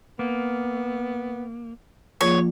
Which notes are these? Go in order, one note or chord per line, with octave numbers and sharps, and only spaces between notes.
A#3 B3
F3 A#3 F4 G#4 C#5